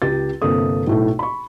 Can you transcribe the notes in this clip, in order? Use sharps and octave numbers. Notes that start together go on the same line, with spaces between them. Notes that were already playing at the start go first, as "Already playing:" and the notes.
C#2 G4 A6
G1 C3 A#3 A4 D#6
B1 A2 A3
B5 C#6